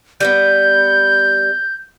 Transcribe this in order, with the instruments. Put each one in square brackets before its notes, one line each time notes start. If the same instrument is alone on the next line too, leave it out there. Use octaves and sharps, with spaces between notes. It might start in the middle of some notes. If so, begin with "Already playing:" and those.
[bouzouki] G3 A#3 B3 [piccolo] G6